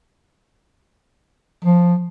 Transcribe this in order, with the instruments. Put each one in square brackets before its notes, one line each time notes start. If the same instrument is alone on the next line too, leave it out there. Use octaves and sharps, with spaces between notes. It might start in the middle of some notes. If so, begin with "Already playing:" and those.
[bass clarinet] F3